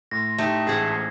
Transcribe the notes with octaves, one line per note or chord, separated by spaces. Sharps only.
A2 C6 A#6
A3 D#4 G4
A1 G#2 G#4 D5 E5 F#5 G#6 C7